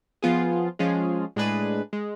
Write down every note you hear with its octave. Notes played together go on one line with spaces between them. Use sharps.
F3 B3 F4 G#4
F3 G#3 C#4 F4 G#4
A2 G#3 D4 G#4 B4
G#3